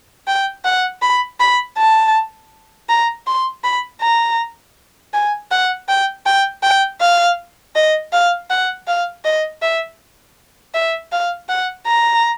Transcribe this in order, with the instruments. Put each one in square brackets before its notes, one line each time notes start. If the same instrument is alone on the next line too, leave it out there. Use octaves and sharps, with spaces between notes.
[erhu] G5
F#5
B5
B5
A5
A#5
C6
B5
A#5
G#5
F#5
G5
G5
G5
F5
D#5
F5
F#5
F5
D#5
E5
E5
F5
F#5
A#5